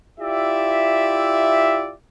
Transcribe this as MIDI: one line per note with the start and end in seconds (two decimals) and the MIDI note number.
0.20 1.93 64
0.20 1.93 65
0.20 1.93 67
0.20 1.93 74
0.20 1.93 76